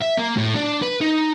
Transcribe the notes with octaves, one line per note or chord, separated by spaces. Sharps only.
E5
A#3
A2
D4
B4
D#4